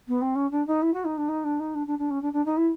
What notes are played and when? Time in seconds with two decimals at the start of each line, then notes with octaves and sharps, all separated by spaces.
0.08 B3
0.21 C4
0.35 C#4
0.51 D4
0.67 D#4
0.82 E4
0.93 F#4
1.05 D#4
1.17 D4
1.28 D#4
1.44 D4
1.59 D#4
1.75 D4
1.87 D4
1.98 D4
2.10 C#4
2.22 D4
2.33 D4
2.45 D#4
2.57 E4